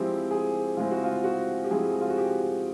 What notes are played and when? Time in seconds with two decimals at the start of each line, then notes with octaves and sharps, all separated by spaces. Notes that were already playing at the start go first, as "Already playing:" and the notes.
Already playing: F3 G#3 C4 E4 G4
0.31 G#4
0.77 F3 G#3 C4 E4 F4
0.91 F#4
1.04 F4
1.24 F#4
1.64 G4
1.70 F3 G#3 C4 E4 G#4
2.01 F4
2.09 F#4
2.18 G4